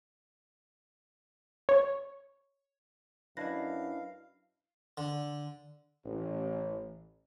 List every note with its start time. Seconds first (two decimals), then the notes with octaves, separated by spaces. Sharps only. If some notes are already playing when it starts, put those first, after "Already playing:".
1.69 C#5
3.37 F#2 D4 E4 B4 D#5 F5 A#6
4.97 D3
6.05 A1